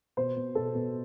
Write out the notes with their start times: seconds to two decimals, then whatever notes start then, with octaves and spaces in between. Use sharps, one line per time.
0.17 B2 C5
0.36 B2
0.55 B2 A4
0.74 B2